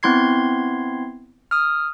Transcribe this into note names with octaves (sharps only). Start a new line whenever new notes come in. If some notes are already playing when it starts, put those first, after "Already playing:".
B3 C4 E4 C6 G#6 C7
D#6 F6